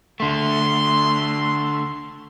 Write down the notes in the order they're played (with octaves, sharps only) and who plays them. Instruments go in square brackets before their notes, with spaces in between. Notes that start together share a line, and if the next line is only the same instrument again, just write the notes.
[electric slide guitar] D3 A3 [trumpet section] C6